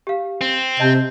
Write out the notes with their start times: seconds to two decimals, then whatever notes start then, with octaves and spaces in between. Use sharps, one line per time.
0.07 G4 F5
0.41 C4
0.80 C3 D#5 A5 G6